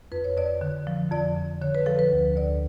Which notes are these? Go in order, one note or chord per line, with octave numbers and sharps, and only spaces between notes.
F2 B4
C#5
F2 D5
D3
F3
F2 D5
F2
D3 C#5
B4
F3 A4
B4
D2
D2 D5